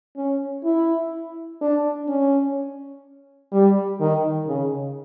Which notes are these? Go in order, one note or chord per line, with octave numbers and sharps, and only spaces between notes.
C#4
E4
D4
C#4
G3
D#3
C#3